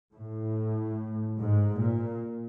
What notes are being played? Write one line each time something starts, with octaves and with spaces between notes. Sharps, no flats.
A2
G#2
A#2